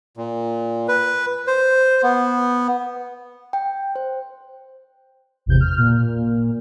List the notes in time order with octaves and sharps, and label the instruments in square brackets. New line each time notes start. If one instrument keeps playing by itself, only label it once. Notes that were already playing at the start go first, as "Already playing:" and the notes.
[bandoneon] A#2
B4
C5
B3
[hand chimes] G5
C5
[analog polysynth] G#1 E2 C3 G6
F6
A#2